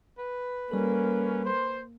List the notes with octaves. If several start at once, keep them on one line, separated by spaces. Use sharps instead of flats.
B4
G3 A#3 C#4 A4
C5